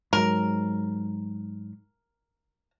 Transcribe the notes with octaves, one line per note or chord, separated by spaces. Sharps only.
G#2 F#3 A#4